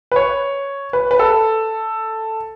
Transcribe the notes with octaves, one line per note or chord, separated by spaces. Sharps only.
B4
C#5
B4
B4
A4